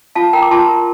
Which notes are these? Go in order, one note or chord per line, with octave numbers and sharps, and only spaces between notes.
F4 F5 A5
A#4 G5 A#5
D6
F4 A5 C6
A#4